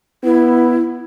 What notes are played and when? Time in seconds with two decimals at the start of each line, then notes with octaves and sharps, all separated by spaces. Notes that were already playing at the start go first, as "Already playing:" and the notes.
0.24 B3 E4